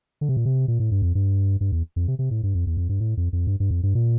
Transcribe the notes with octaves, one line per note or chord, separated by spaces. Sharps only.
D3
C3
A#2
C3
A#2
A2
G2
F2
G2
G2
E2
F2
C3
C3
A2
G2
F2
E2
F2
G2
A2
F2
F2
G2
G2
F2
G2
A#2